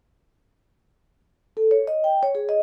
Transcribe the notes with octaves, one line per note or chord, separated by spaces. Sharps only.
A4
C#5
D#5
G5
C#5
G#4
D#5